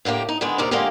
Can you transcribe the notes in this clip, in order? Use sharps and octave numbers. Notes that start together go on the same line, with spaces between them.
A2 D3 A#3 G4
D#4
D3 D#3 G#3 B3
D#2 C3 D#4 A#4 D5
D3 G#3 A#3 C#4 F4 G4